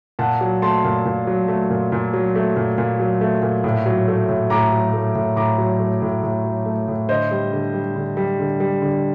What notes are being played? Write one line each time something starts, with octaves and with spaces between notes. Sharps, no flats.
A#2 F#5 A5
F#3
A3 A5 C6
A#2
A#2
F#3
A3
A#2
A#2
F#3
A3
A#2
A#2
F#3
A3
A#2
A2
F#3
A3
A2
A2 A#5 D6
F#3
A3
A2
A2 A#5 D6
F#3
A3
A2
A2
F#3
A3
A2
D3 C5 D#5
G3
D3
G3
D3
G3
D3
G3
D3